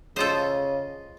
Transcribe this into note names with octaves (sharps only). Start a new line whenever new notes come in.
C#3 F4 A4 C5 D#5